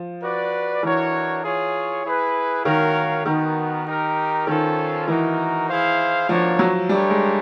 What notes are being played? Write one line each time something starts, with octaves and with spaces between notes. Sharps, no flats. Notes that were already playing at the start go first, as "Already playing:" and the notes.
Already playing: F3
F#4 B4 D5
E3 D4 F#4 A#4 C#5
F4 G#4 C#5
E4 G#4 B4
D#3 F#4 A#4 C#5 F5
D#3 B3 D#4 F#4 A#4
D#4 G4 A#4
D#3 C#4 F4 A4 C5
E3 D#4 F#4 A#4
E4 G#4 C5 F5
F3 A#3 D4 F#4 A#4 C#5
F#3
G3 A3 D4 G4 A#4 C#5
G#3